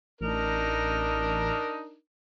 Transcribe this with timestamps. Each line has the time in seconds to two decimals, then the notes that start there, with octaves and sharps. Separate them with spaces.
0.21 A1 D4 D#4 A#4